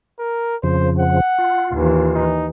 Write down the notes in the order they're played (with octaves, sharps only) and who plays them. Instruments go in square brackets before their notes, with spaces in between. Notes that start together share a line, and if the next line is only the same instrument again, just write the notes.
[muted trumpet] A#4
[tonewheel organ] F2 C#3 F3 [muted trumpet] C5
[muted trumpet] F#5
[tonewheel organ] F4
[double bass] D#2 E3
[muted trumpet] D#4